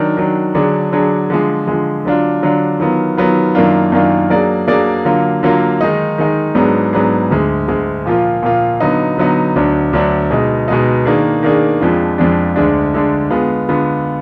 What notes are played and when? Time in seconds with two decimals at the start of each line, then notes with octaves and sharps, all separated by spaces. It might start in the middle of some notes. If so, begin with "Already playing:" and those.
Already playing: D#3 F#3 D4
0.17 D#3 F#3 D4
0.55 D3 F#3 D4 G#4
0.92 D3 F#3 D4 G#4
1.30 D3 F3 G#3
1.68 D3 F3 G#3
2.05 D3 F#3 D4 F4
2.43 D3 F#3 D4 F4
2.80 D#3 F#3 B3 F4
3.17 D#3 F#3 B3 F4
3.55 F#2 D#3 A#3 D4 F4
3.92 F#2 D#3 A#3 D4 F4
4.30 F#3 A#3 D4 G#4 D5
4.68 F#3 A#3 D4 G#4 D5
5.05 D3 F#3 A#3 F4
5.43 D3 F#3 A#3 F4
5.81 D#3 G#3 D#4
6.18 D#3 G#3 D#4
6.55 G#2 F#3 B3 D4 G#4
6.93 G#2 F#3 B3 D4 G#4
7.31 D2 D3 G#3
7.68 D2 D3 G#3
8.06 A#2 F3 A#3 F4
8.43 A#2 F3 A#3 F4
8.80 D3 F#3 B3 D#4
9.18 D3 F#3 B3 D#4
9.56 D2 D3 F#3 D4
9.93 D2 D3 F#3 D4
10.31 B2 G#3 D#4
10.68 B2 G#3 D#4
11.06 D#3 A#3 D4 G#4
11.43 D#3 A#3 D4 G#4
11.81 F2 F3 G#3 D4
12.18 F2 F3 G#3 D4
12.56 D2 D3 G#3 D4
12.94 D2 D3 G#3 D4
13.30 D3 G#3 B3 F4
13.69 D3 G#3 B3 F4